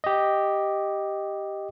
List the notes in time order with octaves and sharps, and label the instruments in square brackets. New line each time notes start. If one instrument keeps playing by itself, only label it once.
[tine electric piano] G4 D#5